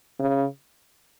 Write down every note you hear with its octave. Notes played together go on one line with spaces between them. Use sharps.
C#3